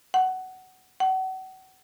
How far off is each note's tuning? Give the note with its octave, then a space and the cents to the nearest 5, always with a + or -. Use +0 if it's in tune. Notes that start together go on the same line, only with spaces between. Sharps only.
F#5 +15
F#5 +35